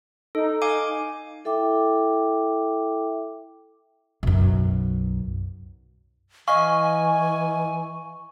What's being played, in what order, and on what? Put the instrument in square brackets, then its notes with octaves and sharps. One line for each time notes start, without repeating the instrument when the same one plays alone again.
[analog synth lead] D#4 [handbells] A4
[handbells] F5 G#5 D6
[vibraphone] E4 A4 E5 G5 D6
[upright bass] B1 F#2
[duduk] E3 [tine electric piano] D#5 F5 [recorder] G#5 [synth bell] C#6